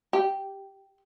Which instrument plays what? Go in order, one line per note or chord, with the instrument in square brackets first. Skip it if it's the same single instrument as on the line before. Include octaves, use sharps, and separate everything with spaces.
[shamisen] G4